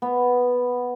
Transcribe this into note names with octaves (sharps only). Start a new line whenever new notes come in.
B3